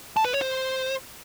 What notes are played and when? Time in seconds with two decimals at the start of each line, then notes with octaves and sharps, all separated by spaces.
0.17 A5
0.25 B4
0.33 C#5
0.41 C5